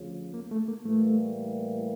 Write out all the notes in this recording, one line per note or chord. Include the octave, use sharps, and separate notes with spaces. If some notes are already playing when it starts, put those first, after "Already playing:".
Already playing: D2 C#3 F3
A#3
A3
A#3
A2 E3 G3 A3 A#3